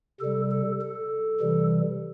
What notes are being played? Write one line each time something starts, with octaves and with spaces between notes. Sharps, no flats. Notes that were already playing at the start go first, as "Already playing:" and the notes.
C3 G3 A4
A4
A4
C3 E3 G3